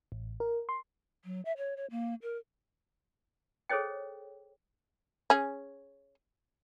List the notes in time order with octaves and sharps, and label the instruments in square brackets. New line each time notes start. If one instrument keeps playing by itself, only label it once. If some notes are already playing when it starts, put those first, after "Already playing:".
[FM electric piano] A1
A#4
C6
[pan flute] F#3
E5
C#5
C#5
A#3
A#4
[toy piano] G#4 A4 C5 C#5 D#5 G5
[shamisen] C#4 G#4